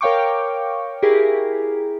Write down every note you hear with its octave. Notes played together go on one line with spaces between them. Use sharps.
A#4 C#5 F5 G5 C#6 D6
E4 G4 G#4 A#4